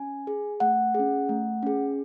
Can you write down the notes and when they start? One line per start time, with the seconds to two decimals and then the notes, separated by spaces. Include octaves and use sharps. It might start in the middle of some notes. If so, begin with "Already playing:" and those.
Already playing: C#4 G#5
0.27 G#4
0.60 A3 F#5
0.94 G#4
0.99 C#4
1.29 A3
1.63 C#4 G#4